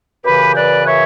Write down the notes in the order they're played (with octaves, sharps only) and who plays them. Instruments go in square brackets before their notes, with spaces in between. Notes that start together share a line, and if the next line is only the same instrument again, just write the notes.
[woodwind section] F#2 C#3 E3 G4 B4
B4 D5
C#5 E5